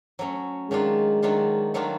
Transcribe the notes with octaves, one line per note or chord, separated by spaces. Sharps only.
F#3 A3 C#4
D#3 F#3 G#3 A3 D4 F4
D#3 F#3 A3 D4 F4
D#3 F#3 A3 D4 F4